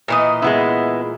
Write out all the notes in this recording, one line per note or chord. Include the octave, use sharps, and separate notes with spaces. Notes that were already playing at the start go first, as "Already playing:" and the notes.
A#2 E3 D#5
G#3 B3 E4